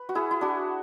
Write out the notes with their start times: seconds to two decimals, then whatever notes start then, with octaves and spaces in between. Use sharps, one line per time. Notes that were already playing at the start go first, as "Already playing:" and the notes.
Already playing: B4
0.09 F#4
0.15 E4 G#4
0.31 E4
0.41 D4 F#4